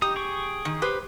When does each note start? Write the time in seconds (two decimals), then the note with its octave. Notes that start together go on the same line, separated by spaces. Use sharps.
0.02 D#4 G4 D#6
0.16 G#4 G5 C#6
0.65 D#3
0.82 G4 B4 C5